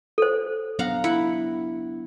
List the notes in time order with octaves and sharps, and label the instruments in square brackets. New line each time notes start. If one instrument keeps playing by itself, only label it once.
[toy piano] A4 C5
[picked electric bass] F#3 B3 D4 [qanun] F5 F#5 A#5
[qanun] E4 F#5